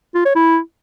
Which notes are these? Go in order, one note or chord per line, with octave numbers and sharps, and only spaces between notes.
F4
C#5
E4